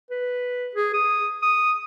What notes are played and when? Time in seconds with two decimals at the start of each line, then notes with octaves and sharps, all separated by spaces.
0.11 B4
0.75 G#4
0.94 D#6
1.42 D#6